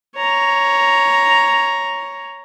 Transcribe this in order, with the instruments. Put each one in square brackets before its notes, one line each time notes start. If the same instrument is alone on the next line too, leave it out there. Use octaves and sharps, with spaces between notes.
[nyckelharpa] C#5 A#5